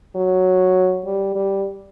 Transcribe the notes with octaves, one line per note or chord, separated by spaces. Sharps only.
F#3
G3
G3